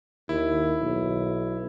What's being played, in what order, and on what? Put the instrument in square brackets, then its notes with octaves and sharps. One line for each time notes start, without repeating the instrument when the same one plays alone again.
[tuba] D#2 [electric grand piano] E4
[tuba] B1